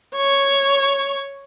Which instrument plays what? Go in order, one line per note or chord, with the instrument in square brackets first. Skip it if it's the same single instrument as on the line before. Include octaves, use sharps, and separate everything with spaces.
[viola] C#5 C#6